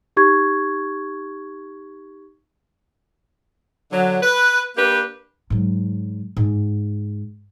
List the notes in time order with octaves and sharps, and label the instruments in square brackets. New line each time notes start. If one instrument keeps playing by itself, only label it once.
[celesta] D#4 G4 C#6 G#6
[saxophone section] D3 F#3
B4
A#3 D4 G4 B4
[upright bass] G#2 F#3
G#2